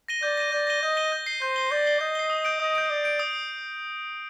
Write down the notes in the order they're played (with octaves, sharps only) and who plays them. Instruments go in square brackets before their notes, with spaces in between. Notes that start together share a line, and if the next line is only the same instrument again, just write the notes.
[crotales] A#6 D#7 G7
[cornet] D5 [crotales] G6
[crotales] A#6 D#7 G7
[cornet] D5 [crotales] G6
[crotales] A#6 D#7 G7
[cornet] D#5 [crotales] G6
[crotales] A#6 D#7 G7
G6
C7 G7
[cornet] C5 [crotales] G6
[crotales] C7 G7
[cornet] D5 [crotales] G6
[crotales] C7 G7
[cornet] D#5 [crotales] G6
[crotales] C7 G7
D#6
G6 D7
[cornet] D#5 [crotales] D#6
[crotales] G6 D7
[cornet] D5 [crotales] D#6
[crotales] G6 D7
D#6